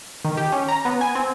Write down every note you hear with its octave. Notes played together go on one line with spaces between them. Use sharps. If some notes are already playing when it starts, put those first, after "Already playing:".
D#3
G4
C#4
A#5
B3
G#5
C4